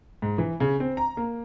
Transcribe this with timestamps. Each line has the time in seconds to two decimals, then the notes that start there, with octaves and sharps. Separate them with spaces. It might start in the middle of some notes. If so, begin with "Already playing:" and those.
0.22 G#2
0.38 E3
0.60 C#3
0.80 C4
0.97 A#5
1.17 A#3